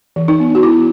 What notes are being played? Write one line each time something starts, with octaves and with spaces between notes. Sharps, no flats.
E3
D#4
B3
F#4
B3 E4